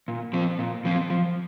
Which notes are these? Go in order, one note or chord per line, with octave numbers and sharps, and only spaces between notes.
A#2
F3 C4
A#2
F3 C4
F3